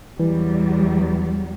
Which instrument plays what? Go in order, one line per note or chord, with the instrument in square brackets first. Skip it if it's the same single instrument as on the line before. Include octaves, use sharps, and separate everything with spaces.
[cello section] E2 F#3 G3 [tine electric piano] E3